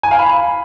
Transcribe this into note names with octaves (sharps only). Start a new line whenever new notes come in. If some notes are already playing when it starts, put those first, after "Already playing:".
G#5
F5
B5